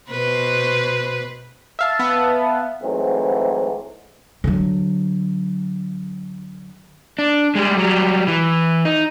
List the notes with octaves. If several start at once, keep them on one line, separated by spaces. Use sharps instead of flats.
B2 B4 C5
E5 F5 A5
B3
G#2 E3 F#3 A3 C4
D3 F#3
D4
G3 G#3
F#3 G3
E3
D#4